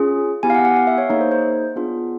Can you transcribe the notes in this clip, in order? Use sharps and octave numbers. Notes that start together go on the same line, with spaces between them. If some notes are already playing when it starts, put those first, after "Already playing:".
Already playing: C#4 F4 G#4
B3 E4 G4 G#5
F5
F#5
F#5
F5
E5
C#5
A#3 D#4 G#4 C#5
C5
C5
B3 D4 F4 G#4